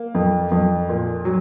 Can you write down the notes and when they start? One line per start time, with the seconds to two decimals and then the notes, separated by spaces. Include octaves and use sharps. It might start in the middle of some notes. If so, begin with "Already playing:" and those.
Already playing: A#3
0.15 F2
0.51 F2
0.89 A#2
1.25 F#3